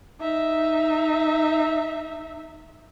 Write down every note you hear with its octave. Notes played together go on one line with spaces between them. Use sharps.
D#4 E5